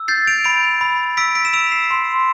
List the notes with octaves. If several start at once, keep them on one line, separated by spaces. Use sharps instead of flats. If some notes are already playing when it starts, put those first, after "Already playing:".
Already playing: E6
G6 A6 C7
D7 F7
B5 D7 F7
B5
E6 B6 D7
B6 D7
E7
E6 D7 F7
C7 E7
C6